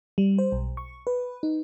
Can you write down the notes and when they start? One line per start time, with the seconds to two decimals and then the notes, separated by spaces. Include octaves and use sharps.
0.18 G3
0.38 C5
0.52 B1
0.77 C#6
1.07 B4
1.43 D#4